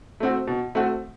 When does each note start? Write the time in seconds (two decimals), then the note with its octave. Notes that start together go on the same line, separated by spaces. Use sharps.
0.20 A3 C4 F#4
0.47 B2
0.75 A3 C4 F#4